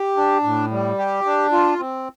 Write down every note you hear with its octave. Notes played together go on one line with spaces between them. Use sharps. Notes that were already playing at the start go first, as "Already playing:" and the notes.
Already playing: G4
D4
A2
G3
G4
D4
F4
C4